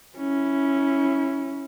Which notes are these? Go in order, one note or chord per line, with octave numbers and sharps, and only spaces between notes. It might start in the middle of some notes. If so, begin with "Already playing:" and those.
C#4 E4